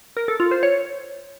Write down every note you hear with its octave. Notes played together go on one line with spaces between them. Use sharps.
A#4
A4
F4
C5
C#5